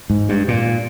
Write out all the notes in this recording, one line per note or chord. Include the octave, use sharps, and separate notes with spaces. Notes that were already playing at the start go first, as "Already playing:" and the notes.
G#2
G2
A#2